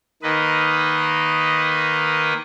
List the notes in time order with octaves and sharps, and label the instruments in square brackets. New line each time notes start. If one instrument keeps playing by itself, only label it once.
[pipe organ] D#3 A#3 B4 D#5